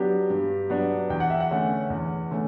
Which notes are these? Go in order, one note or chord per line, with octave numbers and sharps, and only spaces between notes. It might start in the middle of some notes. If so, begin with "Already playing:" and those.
Already playing: F#3 B3 D4 G4
G2
F#3 B3 D4
E2 G5
F#5
E5
F#5
D3 A3 C#4
E2
D3 A3 C#4